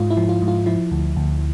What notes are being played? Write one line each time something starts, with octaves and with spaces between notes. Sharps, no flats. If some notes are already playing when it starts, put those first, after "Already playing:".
Already playing: G#2 F4
E4
F3
F4
G#2
F4
F3 E4
D2
D2